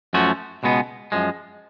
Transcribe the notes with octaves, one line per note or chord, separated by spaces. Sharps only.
F#2 F3 A3 C#4 F#4
C#2 B2 G#3 B3
F#2 F3 G#3